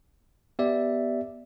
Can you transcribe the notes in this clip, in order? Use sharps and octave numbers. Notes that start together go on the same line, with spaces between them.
B3 G4 D5 E5